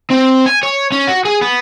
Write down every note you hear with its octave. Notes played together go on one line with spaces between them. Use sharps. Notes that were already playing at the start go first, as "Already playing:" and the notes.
C4
G#5
C#5
C#4
F#4
G#4
B3